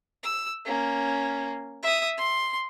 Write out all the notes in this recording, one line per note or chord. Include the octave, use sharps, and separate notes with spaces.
E6
A#3 C#4
E5 D#6
C6